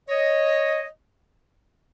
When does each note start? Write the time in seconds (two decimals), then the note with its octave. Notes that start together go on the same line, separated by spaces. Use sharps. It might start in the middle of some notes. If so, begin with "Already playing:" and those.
0.09 C#5 D#5